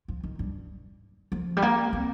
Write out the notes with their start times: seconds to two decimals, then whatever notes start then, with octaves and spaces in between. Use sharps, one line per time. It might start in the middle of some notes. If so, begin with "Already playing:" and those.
0.08 F3
0.23 D#3
0.39 G2
1.32 F3
1.57 G3
1.62 A#3
1.93 C4